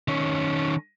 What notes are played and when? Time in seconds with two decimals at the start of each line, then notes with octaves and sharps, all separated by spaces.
0.08 D#3 C#4